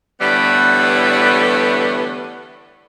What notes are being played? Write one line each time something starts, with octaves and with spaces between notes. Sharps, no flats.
A2 D3 E3 G3 B3